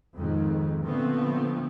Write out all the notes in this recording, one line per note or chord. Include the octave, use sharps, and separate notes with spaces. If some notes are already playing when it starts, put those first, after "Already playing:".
F2 G#2 D#3
A#2 D3 F3 A3 B3 C4